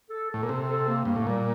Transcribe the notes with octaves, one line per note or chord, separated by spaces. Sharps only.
A4
A2 A4
A#2
C3 A4
A4
A#3
G2 A#3
A2
A#2 G3